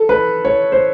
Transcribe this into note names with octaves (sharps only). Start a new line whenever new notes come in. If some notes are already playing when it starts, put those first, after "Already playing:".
Already playing: A4
B4
C#5
C5